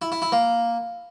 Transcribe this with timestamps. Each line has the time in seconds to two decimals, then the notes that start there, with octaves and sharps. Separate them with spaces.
0.02 E4
0.12 E4
0.22 E4
0.32 A#3